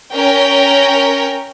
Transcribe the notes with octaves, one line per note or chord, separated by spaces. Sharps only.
C#4 A#4 G5